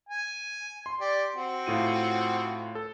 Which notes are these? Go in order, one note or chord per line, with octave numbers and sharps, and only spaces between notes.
G#5
C6
G4 D5
C4 F#4
A2 F4 D#7
A4